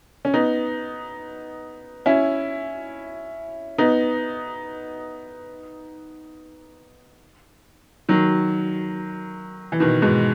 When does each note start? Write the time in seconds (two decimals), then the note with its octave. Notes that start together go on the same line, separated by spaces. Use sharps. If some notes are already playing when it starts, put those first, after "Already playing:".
0.25 C#4
0.34 B3 D#4
2.06 C#4 E4
3.78 B3 D#4
8.09 D#3 F#3
9.72 E3
9.80 B2 D#3
10.02 G#2 B2